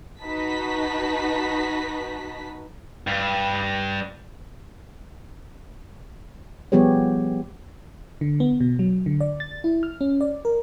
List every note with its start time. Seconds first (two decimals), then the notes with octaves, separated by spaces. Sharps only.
0.22 D#4 F#4 B4 A5 B6
3.07 G2
6.72 F3 G3 B3 G4 G#4 C#5
8.21 D3
8.40 B3
8.60 B2
8.79 F#3
9.06 D3
9.21 D5
9.40 A6
9.64 E4
9.83 F6
10.01 C#4
10.21 D5
10.45 A#4